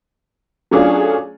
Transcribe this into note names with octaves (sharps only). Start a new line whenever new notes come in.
F#3 A3 C#4 D4 F4 G#4